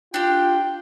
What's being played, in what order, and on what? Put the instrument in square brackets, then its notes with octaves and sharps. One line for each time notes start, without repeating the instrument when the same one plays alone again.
[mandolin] D4 G4 [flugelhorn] F4 [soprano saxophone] G5